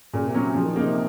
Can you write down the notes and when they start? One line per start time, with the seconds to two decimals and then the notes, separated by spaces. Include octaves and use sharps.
0.13 A#2 C#3
0.28 C3
0.34 A#2 F#3 C#4
0.41 C3
0.55 C#3 F3
0.65 D#3
0.76 C#3 A#3 D#4
0.86 C3